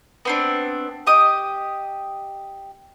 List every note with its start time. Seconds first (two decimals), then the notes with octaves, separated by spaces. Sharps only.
0.25 B3 C4 D4
1.07 G4 D#5 D#6